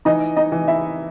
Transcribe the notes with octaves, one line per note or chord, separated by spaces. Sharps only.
E3 D#4 D#5
D#4 D#5
E3
E4 E5